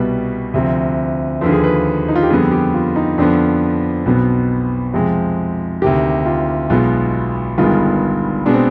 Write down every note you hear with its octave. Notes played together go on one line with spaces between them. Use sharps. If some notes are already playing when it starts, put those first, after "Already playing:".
Already playing: C2 B2 G3 B3 B4
D2 C3 F3
D#2 D3 F3 B4
G#4
B4
D#4
F4
G4
F2 D3 G3 B3 G#4
G4
F4
D#4
F2 D3 F3 B3 D4
B1 B2 B3 C4
F2 C3 F3 G#3
D2 C3 D#3 G4
F4
B1 B2 G#3 B3 F4
G1 G2 D#3 G#3 B3 F4
B2 G#3 B3 D4
C4